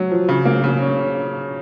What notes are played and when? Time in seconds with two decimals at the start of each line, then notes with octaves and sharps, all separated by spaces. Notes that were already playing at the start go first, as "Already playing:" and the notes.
Already playing: F#3
0.11 F3
0.29 C#3
0.45 A#3
0.64 C#3
0.82 C#4